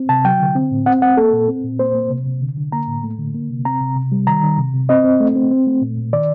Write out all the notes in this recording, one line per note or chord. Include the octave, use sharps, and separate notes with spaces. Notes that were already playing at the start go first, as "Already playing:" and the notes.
Already playing: C4
C3 A5
F#3 G5
D3
C4
A2
C4 F#5
C4 F#5
A#3 A4
A#2
C4
A#2
A#3 C5
A#3
C3
C3
D3
D3
A#3 A#5
A2
A3
D3
A#3
C3
C4 A#5
C3
C3
G3
D#3 A#5
D#3
C3
C3
C4 D#5
C4
A3
C4
C4
A3
A#2
A#2
D#3 D5